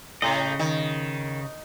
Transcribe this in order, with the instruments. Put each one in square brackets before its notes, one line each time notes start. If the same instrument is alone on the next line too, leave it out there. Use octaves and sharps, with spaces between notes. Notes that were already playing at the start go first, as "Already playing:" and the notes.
[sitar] A2 [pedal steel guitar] C#3 D#5
[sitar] D#3